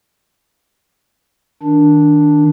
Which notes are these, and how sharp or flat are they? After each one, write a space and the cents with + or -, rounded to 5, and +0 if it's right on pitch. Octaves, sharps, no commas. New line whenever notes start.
D#3 +0 D4 +0